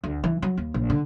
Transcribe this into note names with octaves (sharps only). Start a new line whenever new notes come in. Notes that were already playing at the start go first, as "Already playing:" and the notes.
D2
E3
F#3
D#2
A#1
D3